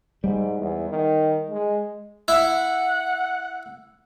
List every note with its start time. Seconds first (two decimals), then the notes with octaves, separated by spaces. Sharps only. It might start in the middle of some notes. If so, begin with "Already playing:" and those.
0.24 G#2 G3
0.59 E2
0.90 D#3
1.50 G#3
2.28 E4 F#5